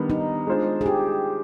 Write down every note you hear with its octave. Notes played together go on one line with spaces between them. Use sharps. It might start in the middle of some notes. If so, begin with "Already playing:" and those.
Already playing: D#3 G3 B3 D4
D#4
G#3 D4 F4 C5
G#4
G4